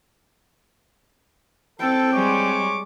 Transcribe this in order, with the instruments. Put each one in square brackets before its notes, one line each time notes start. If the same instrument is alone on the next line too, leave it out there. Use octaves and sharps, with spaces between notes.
[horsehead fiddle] C4 G5 [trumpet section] A4
[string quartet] G3 G#3 [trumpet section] C#5 C#6 D6